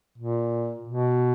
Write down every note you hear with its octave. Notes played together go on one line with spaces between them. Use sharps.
A#2
B2